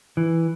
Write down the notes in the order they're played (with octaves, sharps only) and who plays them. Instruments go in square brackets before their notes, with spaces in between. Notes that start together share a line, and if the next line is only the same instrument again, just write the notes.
[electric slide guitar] E3